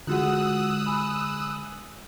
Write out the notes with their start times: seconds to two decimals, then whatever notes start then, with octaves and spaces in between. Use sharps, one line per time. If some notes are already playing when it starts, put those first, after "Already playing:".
0.07 D3 G#3 F4 F#4 F#5 D#6 E6 F#6
0.86 G#5 B5